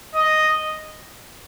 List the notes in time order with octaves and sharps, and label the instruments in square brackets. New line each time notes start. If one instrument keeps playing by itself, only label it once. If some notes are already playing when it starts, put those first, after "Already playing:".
[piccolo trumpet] D#5